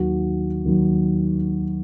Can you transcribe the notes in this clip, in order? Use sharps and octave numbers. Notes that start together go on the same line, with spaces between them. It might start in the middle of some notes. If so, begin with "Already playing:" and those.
Already playing: D#2 D#3 F#3 F#4
D#2 D#3 F#3